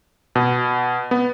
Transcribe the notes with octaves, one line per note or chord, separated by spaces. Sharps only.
B2
B3